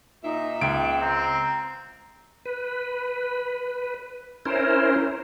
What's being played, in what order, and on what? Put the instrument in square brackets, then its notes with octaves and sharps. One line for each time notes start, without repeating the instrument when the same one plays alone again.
[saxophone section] A#2 E5 [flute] D#4
[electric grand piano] C#2 D7 [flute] G5
[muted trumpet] C4 [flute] A#5
[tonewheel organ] B4
C#4 E4 A#4 C5